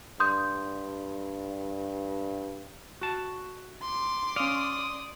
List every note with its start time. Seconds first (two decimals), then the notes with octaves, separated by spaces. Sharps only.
0.20 G2 C6 D#6 G6
3.01 F#4 A5
3.82 C6 D6
4.36 C#4 D5 F5 D#6